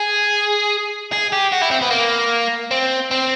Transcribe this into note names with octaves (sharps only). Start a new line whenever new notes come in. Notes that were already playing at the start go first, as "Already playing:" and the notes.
Already playing: G#4
G#4
G4
F#4
E4
C4
B3
A#3
C4
C4